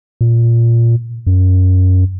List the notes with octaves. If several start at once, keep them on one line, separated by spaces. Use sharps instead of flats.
A#2
F#2